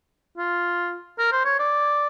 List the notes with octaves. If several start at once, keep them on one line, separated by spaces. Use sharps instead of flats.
F4
A#4
C5
C#5
D5